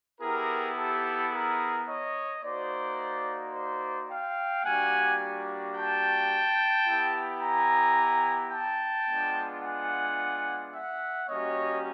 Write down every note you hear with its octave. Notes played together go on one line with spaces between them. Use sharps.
B3 E4 G4 G#4 A#4
G4 A4
G#4 A#4
C#5 D#5
A#3 D#4 F#4 C5 D5
C5 D5
F5 G5
G3 A#3 D4 F#4 F#5 G#5
G5 A5
B3 E4 G4
G#5 A#5
G5 A5
G#3 B3 D4 F4
F#5 G#5
E5 F#5
G3 A#3 C#4 F#4 C#5 D#5